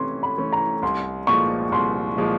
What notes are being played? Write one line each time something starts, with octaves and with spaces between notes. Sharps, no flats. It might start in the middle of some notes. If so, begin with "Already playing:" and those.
Already playing: C3 E3 A3 C#4 C6
B5
E3 A3 C#4
A#5
C2 C6
A#2 F3 G#3 C#6
C2 C6
A#2 F3 G#3